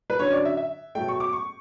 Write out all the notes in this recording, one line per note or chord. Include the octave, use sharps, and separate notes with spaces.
B4
D3 F#3 C#4 C#5
D5
E5
E5
B2 F#3 A3 G5
C#6
D6
C#6